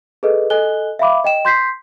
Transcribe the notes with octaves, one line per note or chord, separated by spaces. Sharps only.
G#4 A4 B4 D#5
A4 D#5 G#5 F#6 G7
E5 F5 B5 D6
D#5 G5 E7
C6 G6 B6 C7